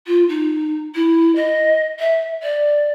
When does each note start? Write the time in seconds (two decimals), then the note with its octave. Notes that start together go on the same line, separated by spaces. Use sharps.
0.07 F4
0.29 D#4
0.95 E4
1.36 D#5
1.99 E5
2.43 D5